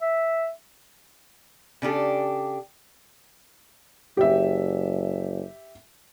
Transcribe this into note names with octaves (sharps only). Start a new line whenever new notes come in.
E5
C#3 D4 G4 A4
F#1 G4 E5